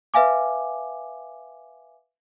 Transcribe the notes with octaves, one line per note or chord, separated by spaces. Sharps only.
B4 E5 F5 G#5 D6